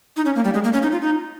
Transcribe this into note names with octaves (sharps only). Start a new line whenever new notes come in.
D#4
C#4
A#3
G3
G#3
A#3
C#4
D#4
F4
D#4